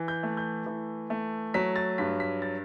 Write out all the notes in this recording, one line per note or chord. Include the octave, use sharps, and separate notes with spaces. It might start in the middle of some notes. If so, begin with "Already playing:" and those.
Already playing: E3
G6
A3
G6
E3
A3
F#3 B6
A6
G2 B6
B6
A6